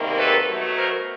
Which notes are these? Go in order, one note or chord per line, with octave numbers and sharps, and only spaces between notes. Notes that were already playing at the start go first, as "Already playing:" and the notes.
Already playing: E2 C3 D#3 G3 A#3
A4 B4
B2 F#3 A3
A#4 C5